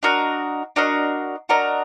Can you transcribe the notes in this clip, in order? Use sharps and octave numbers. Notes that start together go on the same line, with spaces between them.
D4 F#4 A#4 D#5
D4 F#4 A#4 D#5
D4 F#4 A#4 D#5